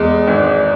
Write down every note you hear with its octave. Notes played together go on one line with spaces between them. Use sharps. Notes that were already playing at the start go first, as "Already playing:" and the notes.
Already playing: E2 G#3
G#1